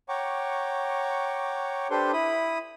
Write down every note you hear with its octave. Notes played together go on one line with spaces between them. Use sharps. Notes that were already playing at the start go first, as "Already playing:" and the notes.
C#5 F#5 G5 A#5 C#6 D6
D4 G4 A4 B4 C5 C6
E4 B5 D#6